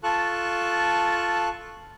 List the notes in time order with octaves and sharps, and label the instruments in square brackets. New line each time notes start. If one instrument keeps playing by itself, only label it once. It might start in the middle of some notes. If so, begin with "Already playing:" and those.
[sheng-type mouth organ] F4 A4 A5 C#6 F#6